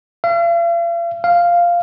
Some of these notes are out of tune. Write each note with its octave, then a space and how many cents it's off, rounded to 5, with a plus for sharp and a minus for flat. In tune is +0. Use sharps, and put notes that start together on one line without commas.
F5 -45
F5 -5